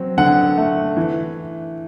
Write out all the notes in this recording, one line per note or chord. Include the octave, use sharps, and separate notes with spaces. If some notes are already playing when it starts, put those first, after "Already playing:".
Already playing: F#3 C4
D3 F#5
A3
E3